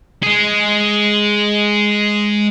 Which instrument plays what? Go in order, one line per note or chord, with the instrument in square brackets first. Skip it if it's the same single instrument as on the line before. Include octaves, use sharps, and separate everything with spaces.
[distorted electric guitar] G#3 G#4